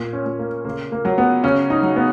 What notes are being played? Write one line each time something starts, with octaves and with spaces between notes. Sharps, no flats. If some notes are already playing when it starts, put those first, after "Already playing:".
Already playing: A#2
C#4
A#2
A#3
C#3 A#3
A#3
F#3
B3
C#3 C#4
D#4
F#3
B3